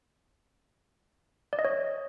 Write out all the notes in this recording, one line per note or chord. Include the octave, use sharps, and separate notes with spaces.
D5
D#5
C#5